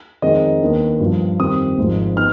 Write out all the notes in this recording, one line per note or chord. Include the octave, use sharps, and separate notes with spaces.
F2 D#3 G#3 C4 D#4 D#5
D#2 D#3 B3 D4
G2 F3 B3
F2 D#3 G3 C4 D#6
G#1 G#2 F3
B3 D#4 F6